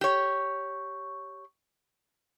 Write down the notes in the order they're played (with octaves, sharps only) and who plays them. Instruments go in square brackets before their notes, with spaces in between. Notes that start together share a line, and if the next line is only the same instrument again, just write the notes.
[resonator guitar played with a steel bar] G4 C#5